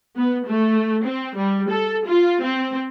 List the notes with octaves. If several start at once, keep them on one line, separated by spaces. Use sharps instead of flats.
B3
A3
C4
G3
A4
F4
C4